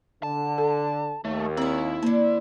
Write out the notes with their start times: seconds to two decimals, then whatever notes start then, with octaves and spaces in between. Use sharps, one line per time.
0.23 D3 A5
0.58 A4
1.25 D#2 A3
1.57 C4 E4 F4 C#5
2.03 D3 A#3 C5